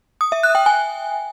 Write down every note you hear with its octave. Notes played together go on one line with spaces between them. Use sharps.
D#6
E5
F#6
G5
G#5